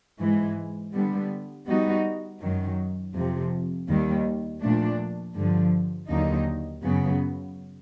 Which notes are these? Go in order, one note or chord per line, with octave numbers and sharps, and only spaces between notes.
G#2 E3 G#3
D3 G3 B3
G3 B3 D#4 F#4
F#2 D#3 F#3
F2 C3 F3
D#2 D#3 G3
A#2 F3 A3 D4
G2 D3 F3
D#2 D3 F#3 A#3 D#4
F#2 C#3 F#3 B3